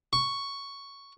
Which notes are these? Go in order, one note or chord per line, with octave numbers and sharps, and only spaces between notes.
C#6